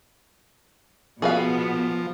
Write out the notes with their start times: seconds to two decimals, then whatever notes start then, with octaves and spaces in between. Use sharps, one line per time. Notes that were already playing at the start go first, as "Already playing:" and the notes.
1.22 B2 F3 B3 G#4 B4 F5